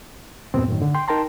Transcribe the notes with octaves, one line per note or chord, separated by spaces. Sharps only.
E2 G2 A#2 B3 C4
F#2 A2 D#3
D3
G5 C6
D#4 A#4 G5 A5 A#5 C6